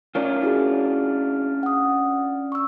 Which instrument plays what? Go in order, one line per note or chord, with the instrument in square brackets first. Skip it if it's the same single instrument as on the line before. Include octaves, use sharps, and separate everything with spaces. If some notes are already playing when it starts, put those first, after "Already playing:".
[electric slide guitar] C#4 D4 F4 [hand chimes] A#4 C#5 D5
[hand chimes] E4 F#4 G#4
F#5 D#6
C#6 E6